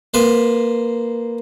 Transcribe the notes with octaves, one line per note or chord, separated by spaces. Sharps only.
A#3 B4 C5